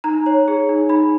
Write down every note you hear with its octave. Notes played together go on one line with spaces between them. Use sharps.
D#4 A#5
C#5
G#4
D#4
D#4 B5